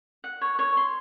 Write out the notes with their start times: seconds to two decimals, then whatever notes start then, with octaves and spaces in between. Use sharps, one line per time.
0.24 F#5
0.41 C#5
0.59 C#5
0.77 C6